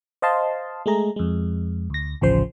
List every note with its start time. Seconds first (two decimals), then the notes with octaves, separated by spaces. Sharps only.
0.22 C5 D#5 F5 A5 C6
0.86 G#3 A3 G#4 A#5
1.16 F2 G#3
1.90 D2 A#6
2.21 A1 D2 C#3 F3 C5 C6